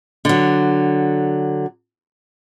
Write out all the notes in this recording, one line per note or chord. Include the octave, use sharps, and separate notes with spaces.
D3 F#3